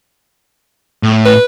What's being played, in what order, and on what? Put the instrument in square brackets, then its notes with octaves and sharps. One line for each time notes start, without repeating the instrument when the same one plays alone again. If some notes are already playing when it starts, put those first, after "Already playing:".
[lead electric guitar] A2
[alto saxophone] B4